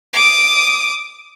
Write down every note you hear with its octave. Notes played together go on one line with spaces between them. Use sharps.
D6 D#6